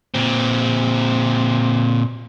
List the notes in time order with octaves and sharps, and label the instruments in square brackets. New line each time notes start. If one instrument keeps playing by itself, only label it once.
[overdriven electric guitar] A#2 C4